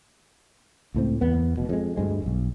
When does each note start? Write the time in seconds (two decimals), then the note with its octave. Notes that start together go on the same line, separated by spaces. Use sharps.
0.94 C#2 A2 C4
1.21 E2 B3
1.57 F1 B2
1.69 F2 G#3
1.97 D2 G2 G#3
2.22 D#1 B1